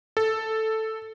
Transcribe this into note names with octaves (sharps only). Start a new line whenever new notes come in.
A4